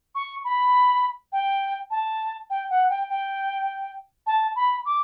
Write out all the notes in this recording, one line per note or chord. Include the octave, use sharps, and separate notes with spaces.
C#6
B5
G5
A5
G5
F#5
G5
G5
A5
B5
D6